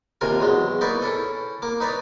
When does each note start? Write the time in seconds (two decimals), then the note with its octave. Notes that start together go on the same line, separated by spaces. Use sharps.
0.21 D#2 C3 F4 A#4 G#5
0.40 E2 F#3 G#3
0.81 A#3 D#4 B4 D5 C#6
1.02 C#4 E4 A4
1.62 A#3 D6
1.80 D#4 B4 C#5 D5